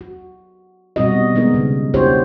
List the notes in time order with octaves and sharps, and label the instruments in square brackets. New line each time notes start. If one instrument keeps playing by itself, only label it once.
[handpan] F#4
B2 G3 C4 D#4 F#4 D#5
D#3 G#3 B3 D#4 A#4
C#3 D#4
D4 E4 F#4 G4 C5 C#5